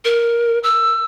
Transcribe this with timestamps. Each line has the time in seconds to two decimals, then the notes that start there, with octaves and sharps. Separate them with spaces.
0.05 A#4
0.63 E6